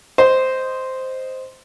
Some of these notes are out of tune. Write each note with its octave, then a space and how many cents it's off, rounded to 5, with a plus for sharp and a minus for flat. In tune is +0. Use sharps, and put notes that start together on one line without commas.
C5 -5 D#5 +0